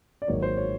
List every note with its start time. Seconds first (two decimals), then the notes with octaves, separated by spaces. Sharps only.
0.22 D5
0.27 G#1 G#2 D#3 F#3 A#3 C#5
0.42 C5
0.57 C#5